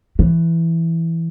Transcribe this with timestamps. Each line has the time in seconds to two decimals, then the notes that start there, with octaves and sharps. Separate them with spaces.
0.19 E3